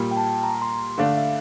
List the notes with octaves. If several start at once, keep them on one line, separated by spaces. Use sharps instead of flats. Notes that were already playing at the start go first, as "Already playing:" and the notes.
Already playing: A#2 G3 A#3
G5
A5
A#5
C6
D3 A3 D4 F5
E5